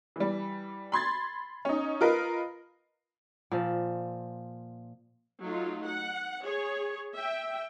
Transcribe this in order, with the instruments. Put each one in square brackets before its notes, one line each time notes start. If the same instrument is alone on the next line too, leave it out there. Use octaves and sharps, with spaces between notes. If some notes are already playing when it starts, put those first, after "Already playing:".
[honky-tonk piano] E3 G3
B5 C6 G#6 A6
C#4 D#4
F4 A#4 B4 D#5
[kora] A#2 F3
[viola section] F#3 A3 D#4 F4
F#5
G#4 C#5
E5 G5